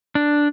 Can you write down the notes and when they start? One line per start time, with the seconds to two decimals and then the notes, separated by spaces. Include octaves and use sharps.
0.15 D4